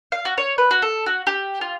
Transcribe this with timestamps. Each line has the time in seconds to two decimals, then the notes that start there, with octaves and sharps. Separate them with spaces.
0.12 F5
0.25 F#4
0.38 C#5
0.58 B4
0.71 F#4
0.82 A4
1.06 F#4
1.27 G4
1.61 F4